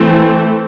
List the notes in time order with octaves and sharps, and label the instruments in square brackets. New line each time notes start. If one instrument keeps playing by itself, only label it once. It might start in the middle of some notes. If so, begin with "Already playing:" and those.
Already playing: [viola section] E3 A3 C4